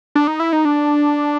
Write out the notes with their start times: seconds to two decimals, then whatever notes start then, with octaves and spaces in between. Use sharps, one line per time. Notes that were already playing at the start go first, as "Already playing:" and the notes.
0.15 D4
0.27 D#4
0.40 E4
0.53 D#4
0.65 D4